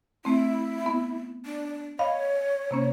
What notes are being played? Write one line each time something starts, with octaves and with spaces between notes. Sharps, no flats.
A3 C4 E4
B3
D4
C#5 D#5 F5 B5
C3 A#3 C#4